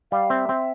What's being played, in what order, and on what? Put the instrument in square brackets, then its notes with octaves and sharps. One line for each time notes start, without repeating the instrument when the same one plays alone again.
[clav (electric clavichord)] G3 [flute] F5
[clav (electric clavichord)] C4 [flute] E5
[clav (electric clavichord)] C4